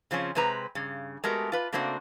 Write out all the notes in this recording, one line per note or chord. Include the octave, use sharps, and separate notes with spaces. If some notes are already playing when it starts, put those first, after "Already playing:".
C#3 F3 C4 C#4
C3 G#3 C4 B4 A#5
G2 C#3
G#3 A3 B3 F#4 G4 A#4
F4 B4
C#3 A3 A#3 C4 D4 F#4